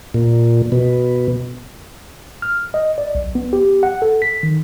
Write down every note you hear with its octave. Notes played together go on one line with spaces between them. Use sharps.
A#2
B2
F6
D#5
D5
B1
B3
G4
F#5
A4
B6
D#3